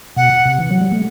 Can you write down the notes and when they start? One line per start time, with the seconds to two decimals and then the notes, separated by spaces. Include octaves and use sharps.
0.16 B2 F#5
0.45 C3
0.60 E3
0.71 F#3
0.81 G3
0.92 A3